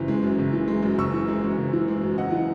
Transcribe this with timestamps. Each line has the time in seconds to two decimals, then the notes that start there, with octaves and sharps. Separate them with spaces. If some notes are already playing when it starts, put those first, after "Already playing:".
Already playing: F#1 E3
0.08 G#3
0.23 F#2
0.39 F#1
0.53 E3
0.68 G#3
0.83 F#2
0.98 F#1 C#6 E6
1.14 E3
1.28 G#3
1.44 F#2
1.58 F#1
1.73 E3
1.88 G#3
2.03 F#2
2.18 C#2 D#5 F#5
2.32 E3